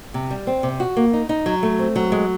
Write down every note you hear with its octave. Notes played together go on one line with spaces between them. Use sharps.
C3
G3
C4
C3
F#4
A#3
D#4
D#4
F#3
A3
C4
F#3
G#3